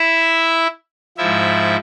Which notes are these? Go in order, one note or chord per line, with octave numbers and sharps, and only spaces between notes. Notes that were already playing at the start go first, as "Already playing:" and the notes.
Already playing: E4 E5
G#2 F3 E4 E5